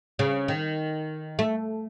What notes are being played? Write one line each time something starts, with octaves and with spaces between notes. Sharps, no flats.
C#3
D#3
A3